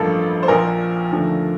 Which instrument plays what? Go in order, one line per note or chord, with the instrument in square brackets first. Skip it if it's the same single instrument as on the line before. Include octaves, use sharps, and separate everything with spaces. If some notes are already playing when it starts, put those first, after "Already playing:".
Already playing: [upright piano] A1 G2 F3 A#3 A4
C5
A#1 A#2 F3 A#4
D#2 D3 F3 A3